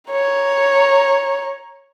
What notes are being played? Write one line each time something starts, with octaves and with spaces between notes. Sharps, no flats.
C#5 A#5